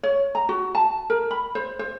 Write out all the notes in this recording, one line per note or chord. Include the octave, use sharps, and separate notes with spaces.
C#5
A#5
F#4
A5
A#4
B5
C5
C5